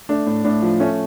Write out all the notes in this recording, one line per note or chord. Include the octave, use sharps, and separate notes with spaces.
A3 D4
A2
A2 D4
F3
A3 C#4